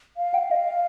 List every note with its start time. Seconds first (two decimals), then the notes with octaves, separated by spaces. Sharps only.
0.17 F5
0.34 G5
0.39 F5
0.51 D#5
0.56 F5